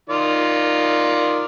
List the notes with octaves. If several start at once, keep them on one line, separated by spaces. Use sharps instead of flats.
D#3 F4 D5